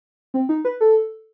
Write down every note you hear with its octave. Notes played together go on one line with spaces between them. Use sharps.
C4
D#4
B4
A4